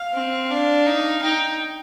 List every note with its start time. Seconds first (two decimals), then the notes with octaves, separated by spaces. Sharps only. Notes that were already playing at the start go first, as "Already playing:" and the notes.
Already playing: F5
0.14 C4
0.50 D4 F5
0.86 D#4
1.22 D#4 G5